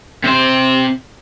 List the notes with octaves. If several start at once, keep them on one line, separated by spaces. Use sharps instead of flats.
C3 C5